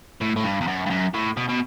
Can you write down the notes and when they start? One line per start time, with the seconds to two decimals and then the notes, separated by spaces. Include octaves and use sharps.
0.21 A2
0.36 A2
0.44 G2
0.61 E2
0.67 F#2
0.86 G2
0.90 F#2
1.14 A2
1.37 B2
1.49 B2